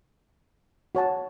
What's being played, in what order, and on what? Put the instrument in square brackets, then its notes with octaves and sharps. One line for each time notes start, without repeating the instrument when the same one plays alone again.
[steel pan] F#4 C#5 F#5 A5